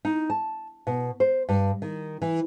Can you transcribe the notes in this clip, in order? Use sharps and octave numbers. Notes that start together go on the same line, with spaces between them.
D#4
A5
B2
C5
G2
D#3
E3